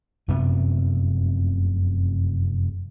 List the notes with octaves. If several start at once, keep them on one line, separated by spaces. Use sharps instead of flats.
F1 F#2 C3 B3